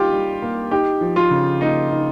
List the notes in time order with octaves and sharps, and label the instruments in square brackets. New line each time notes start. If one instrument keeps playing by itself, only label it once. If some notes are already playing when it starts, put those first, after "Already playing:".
Already playing: [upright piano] G3 A#3 D#4 [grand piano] F4 G4
[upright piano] G3
A#3
[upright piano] D#4 [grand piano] G4
[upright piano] F3
[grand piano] F4
[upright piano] C#3
[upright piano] A#3 [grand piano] D#4
[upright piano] D#4